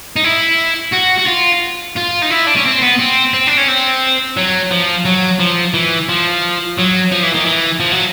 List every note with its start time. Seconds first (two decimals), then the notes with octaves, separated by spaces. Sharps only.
0.16 D#4
0.24 E4
0.93 F#4
1.19 F#4
1.28 F4
1.96 F4
2.22 D#4
2.30 E4
2.46 D4
2.56 C#4
2.65 C4
2.82 B3
2.99 C4
3.34 C4
3.47 D4
3.58 C#4
3.68 C4
4.37 F#3
4.71 F3
5.05 F#3
5.40 F3
5.74 E3
6.09 F3
6.78 F#3
7.12 F3
7.23 E3
7.35 D#3
7.46 E3
7.80 F3
7.93 F#3